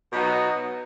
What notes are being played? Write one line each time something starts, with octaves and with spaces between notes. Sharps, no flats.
B2 F#3 B3 D#4 F#4